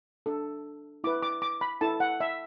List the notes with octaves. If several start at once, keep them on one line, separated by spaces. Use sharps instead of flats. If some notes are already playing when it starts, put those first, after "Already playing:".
D4 A4
E4 B4 D6
D6
D6
B5
E4 A4 A5
F#5
E5